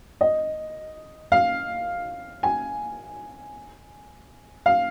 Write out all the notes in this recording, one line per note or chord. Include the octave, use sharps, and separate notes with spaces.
D#5
F5
G#5
F5